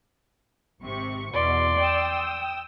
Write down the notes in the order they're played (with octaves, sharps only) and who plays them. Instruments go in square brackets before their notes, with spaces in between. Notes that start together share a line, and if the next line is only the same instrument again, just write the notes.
[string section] G#1 C3 C#6
[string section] E2 B2 [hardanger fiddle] D5 C6
[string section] G5 D#6 E6